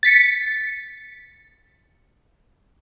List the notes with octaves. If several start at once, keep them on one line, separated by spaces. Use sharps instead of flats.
A6 B6 C#7